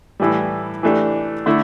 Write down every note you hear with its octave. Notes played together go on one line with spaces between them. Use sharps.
A2 E3 G3
E3 A3 D4 G4
D3 A3 E4